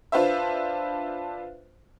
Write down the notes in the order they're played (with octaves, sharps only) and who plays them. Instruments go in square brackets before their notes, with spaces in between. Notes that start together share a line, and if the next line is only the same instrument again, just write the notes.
[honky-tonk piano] D4 F4 B4 C5 E5